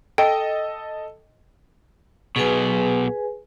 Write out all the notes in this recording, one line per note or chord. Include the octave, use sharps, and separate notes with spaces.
A4 D#5 G5
B1 B2 G#4 B4 G#5